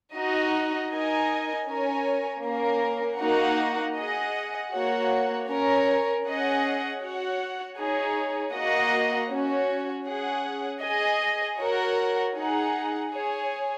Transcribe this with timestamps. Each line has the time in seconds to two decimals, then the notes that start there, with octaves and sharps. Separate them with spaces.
0.15 D#4 F#4 D#5
0.91 D#4 A#4 D#5 G#5
1.68 C#4 A#4 C#5 G#5
2.44 A#3 C#4 A#4
3.20 A#3 D#4 F#4 A#4 F#5
3.97 G#4 D#5 F#5
4.73 A#3 F#4 C#5 F#5
5.49 C#4 A#4 C#5
6.26 C#4 G#4 D#5 F#5
7.02 F#4 C#5 F#5
7.78 D#4 G#4 C#5
8.55 A#3 F#4 D#5 F#5
9.31 C#4 F#4 C#5
10.07 C#4 G#4 F#5
10.83 G#4 D#5 G#5
11.60 F#4 A#4 C#5 F#5
12.36 D#4 G#4 F#5
13.12 G#4 C#5 G#5